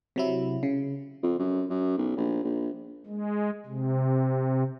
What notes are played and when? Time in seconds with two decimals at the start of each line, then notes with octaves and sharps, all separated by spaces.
0.16 C3 F#3 E4
0.63 C#3
1.23 F2
1.39 F#2
1.70 F#2
1.97 B1
2.17 A#1
2.44 A#1
3.06 G#3
3.66 C3